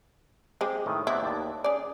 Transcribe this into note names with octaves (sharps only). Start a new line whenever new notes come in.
G#3 C4 G4
A2 D#3
B3 C4 D4 E4
D#2 D5 A5
C#4 G#4 D5